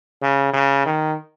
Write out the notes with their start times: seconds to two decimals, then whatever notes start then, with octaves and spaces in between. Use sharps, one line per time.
0.22 C#3
0.53 C#3
0.86 D#3